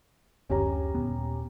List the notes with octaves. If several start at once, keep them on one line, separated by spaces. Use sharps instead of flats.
F#1 D2 C#4 G4 A#5
D#1 B3